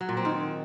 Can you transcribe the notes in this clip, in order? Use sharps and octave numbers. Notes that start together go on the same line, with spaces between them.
F#3
A#2
C4
D#3